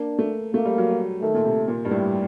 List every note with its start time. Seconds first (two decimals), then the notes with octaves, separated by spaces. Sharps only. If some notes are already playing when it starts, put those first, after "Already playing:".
Already playing: A#3 D4
0.19 A3
0.54 A3 A#3
0.65 G3
0.78 F#3
0.90 G3
1.21 D#3 A3
1.34 A#2
1.45 C3
1.68 A#2
1.85 G2
1.91 A2 G3